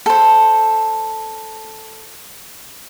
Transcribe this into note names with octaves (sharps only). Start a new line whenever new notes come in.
A4 C5